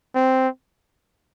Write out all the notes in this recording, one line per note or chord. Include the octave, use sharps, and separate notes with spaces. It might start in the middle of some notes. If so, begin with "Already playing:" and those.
C4